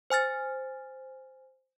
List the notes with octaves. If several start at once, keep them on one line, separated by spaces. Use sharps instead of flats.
C5 G#5 F6 A6